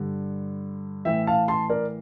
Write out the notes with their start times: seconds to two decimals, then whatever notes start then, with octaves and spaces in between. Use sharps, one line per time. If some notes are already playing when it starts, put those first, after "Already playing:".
Already playing: G2 D3
1.05 A2 E3 E5 G5
1.27 F5 A5
1.48 A5 C6
1.69 A#4 D5